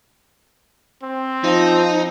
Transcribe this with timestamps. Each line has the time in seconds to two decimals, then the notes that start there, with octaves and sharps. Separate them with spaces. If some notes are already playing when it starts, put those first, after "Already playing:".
1.03 C4
1.44 F3 D#4